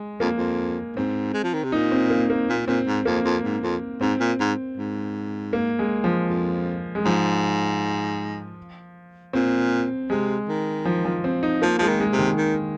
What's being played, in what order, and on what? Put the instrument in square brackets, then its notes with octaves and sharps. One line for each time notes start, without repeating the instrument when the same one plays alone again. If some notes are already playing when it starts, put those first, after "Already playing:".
Already playing: [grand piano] G#3
[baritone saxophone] F2 [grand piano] A#3
[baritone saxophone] F2
[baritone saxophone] G#2 [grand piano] C4
[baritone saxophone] G#3
F3
D#3
C3
[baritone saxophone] A#2 [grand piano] D#4
[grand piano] C4
A#3
A#3
[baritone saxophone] A#2
[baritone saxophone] A#2 [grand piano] C4
[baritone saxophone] G#2
[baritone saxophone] F2 [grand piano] A#3
[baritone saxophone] F2
G#2
F2
[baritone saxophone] G#2 [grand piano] C4
[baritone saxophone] A#2
G#2
G#2
[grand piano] A#3
G#3
F3
[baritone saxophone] F2
[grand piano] G#3
[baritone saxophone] G#2 [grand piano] F3
[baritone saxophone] A#2 [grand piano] C4
[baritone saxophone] C3 [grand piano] G#3
[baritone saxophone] D#3
[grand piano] F3
F3
C4
D#4
[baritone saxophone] F3 [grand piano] A#3
[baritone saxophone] F3 [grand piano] G#3
[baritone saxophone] D#3
[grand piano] G#3
[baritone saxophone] C3
[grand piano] D#3
[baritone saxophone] D#3